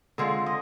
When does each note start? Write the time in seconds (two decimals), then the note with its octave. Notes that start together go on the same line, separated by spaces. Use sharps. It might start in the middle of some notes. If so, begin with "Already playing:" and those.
0.18 D3 G#3 C4 F4
0.46 D#5